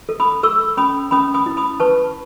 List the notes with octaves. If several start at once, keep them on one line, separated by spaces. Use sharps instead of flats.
A4
B5 D#6
A4 C#6 E6
C#4 B5 D#6
C#4 B5 D#6
B5 D#6
E4
B5 D#6
B4 A5 C#6